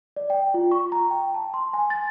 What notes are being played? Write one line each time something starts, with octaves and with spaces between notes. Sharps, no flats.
D5
G5
F4
C#6
A#5
G5
A5
C6
G#5
A6